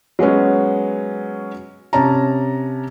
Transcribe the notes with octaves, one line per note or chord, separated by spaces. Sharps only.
F#3 G#3 B3 C#4
C3 C#4 A5 A#5